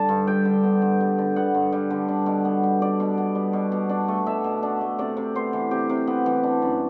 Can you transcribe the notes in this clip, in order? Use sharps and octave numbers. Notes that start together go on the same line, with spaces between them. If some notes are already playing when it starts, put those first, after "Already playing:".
Already playing: D3 G3 D5 A5
G2
G3 G5
D3
B3
G2
G3
D3
B3 F#5
G2
G3
D3
D4
B2
B3
G3
D4 D5
B2
B3
G3
B2
B2
D4
A3
B2 E5
B2
D4
A3
C3 D5
C3
B3 C5
E3
C3 G4
C3
B3
E3
D4
F#2